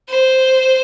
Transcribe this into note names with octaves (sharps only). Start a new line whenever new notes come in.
C5